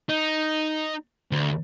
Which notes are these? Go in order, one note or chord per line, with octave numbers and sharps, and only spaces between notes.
D#4
D2